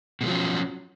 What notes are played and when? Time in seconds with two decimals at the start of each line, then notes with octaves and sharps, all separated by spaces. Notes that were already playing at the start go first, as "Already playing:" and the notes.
0.21 B2
0.23 G#3
0.26 F3
0.29 F#3
0.31 C#4